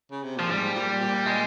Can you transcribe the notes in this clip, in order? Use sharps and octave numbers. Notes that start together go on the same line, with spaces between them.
C#3
C3
A#2 F3
G#2 G3
A#2
A#2
G#3